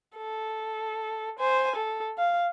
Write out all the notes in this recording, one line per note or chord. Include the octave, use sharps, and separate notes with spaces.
A4
C5 G#5
A4
F5